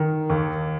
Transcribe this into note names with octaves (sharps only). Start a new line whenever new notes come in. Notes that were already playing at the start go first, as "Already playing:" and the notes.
Already playing: D#3
D#2